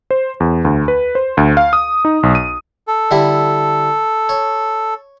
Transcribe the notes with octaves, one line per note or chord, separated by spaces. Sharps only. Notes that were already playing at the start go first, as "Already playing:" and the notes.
C5
E2
D2
B4
C5
D2
F5
D#6
D#4
B1
D#7
A4
D3 G3 E4
C#5